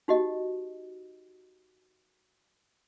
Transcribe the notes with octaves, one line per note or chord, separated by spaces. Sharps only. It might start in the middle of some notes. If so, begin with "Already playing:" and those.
D#4 F#4 G4 D#5